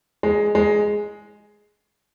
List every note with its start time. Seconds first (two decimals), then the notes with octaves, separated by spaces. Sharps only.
0.23 G#3
0.55 G#3